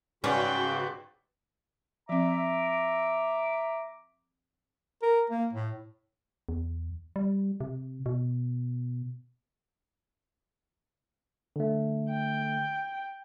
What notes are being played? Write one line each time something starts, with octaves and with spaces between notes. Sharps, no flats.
G#2 C#3 C#4 F#4 B4 D5 G5 B5
F3 C4 E5 A#5 D6
A#4
A#3
A2
E2
G3
C3
B2
D3 A3
G5